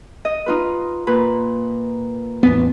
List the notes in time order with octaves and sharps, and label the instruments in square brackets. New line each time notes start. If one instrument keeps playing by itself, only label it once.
[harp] D#5
D#4 F4 B4
A#2 B4
[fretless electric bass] A1 E2 B3